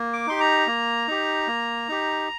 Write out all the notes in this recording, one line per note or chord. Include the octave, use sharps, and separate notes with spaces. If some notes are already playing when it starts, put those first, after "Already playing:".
Already playing: A#3
D6
D#4 G4 C6
A#5
A#3
D#4 G4
A#3
D#4 G4